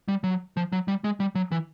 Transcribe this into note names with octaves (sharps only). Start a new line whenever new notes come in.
G3
F#3
F3
F#3
G3
G#3
G3
F#3
E3